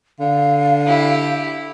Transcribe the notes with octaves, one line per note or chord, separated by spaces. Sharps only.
D3 F5
E4 G4